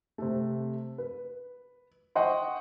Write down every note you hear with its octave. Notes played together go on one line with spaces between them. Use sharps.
C3 A3
B4
C5 D#5 F#5 G5 C#6